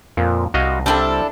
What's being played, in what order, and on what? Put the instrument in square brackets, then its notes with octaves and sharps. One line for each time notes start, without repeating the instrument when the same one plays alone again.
[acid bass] F2 [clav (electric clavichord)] A#2
[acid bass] C2 [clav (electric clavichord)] F#4 D#5 F5
[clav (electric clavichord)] G3 C4 [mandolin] D4 E4 A4